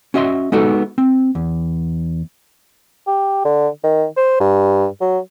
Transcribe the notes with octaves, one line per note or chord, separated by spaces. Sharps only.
C#4 F#4 D#5 E5 C6
G#3 B3 D#4 F#4 A4
C4
E2
G4
D3
D#3
C5
G2
F#3